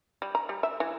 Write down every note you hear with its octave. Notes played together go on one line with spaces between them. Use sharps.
G3
A#5
G3
E5
E3